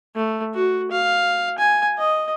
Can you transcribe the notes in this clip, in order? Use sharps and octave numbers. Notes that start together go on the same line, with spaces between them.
A3
F#4
F5
G#5
D#5